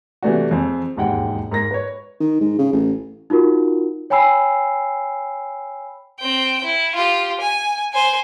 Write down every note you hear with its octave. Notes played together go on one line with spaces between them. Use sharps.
C3 E3 G3 A3 D4 F#4
F2 G#4 C5
E1 D#2 G#2 F#5 G5
G#2 A#4 A#6
B4 C#5
D#3
G#2
C#3
A1
D#4 F4 F#4 A#4
C#5 G5 G#5 B5 E6 C7
C4 G5
E4
F4 G4
G#5
C5 G#5